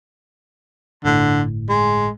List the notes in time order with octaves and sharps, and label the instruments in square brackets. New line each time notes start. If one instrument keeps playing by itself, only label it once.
[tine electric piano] G1 A2 [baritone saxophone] D3
[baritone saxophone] G#3